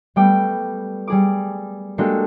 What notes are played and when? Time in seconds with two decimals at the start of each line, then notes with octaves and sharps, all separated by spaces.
0.16 G3 A3 B3 G5 D6
1.07 G3 G#4 D6
1.98 G#3 A#3 D4 F#4 G4 A4